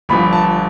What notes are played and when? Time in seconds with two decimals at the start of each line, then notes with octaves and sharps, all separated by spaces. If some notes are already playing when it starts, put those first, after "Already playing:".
0.09 G1 G2 F3 B5
0.33 A5